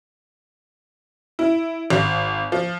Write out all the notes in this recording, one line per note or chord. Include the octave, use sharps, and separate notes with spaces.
E4
G#1
F3